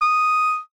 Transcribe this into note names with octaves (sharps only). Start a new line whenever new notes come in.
D#6